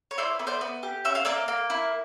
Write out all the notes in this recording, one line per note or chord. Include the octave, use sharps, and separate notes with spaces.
C#5
E4 C5 D5
B3
C5 D5
B3
G4
C#4 E5
F5
A#3 D5 E5
A#3
E4